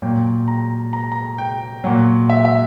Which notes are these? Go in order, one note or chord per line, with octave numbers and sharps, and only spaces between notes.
A#2 F#3 G5
A#5
A#5
A#5
G5
A#2 F#3 F#5
E5
E5